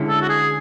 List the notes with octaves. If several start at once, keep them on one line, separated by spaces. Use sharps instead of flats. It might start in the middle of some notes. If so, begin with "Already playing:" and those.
Already playing: D3 G#3 C#4 E4
A4
F#4
G#4